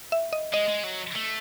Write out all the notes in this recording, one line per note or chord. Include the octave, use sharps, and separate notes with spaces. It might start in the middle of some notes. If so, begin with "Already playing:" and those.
E5
D#5
G#3 D#5
G#3
F#3
A3